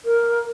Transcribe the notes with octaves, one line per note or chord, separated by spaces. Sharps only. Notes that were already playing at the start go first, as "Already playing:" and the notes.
A#4